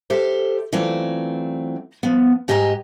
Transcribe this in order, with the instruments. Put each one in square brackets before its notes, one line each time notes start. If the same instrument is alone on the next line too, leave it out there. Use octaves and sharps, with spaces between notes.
[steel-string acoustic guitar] G4 A4 C5 E5
E3 F#3 A3 C4 F4 D5
F3 B3
G#2 G4 D#5 G#5 A#5